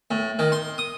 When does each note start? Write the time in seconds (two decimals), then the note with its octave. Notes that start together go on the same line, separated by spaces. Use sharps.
0.11 A2
0.39 D#3
0.52 C6
0.78 D#6